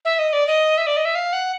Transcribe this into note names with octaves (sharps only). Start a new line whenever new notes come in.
E5
D#5
D5
D#5
E5
D5
D#5
E5
F5
F#5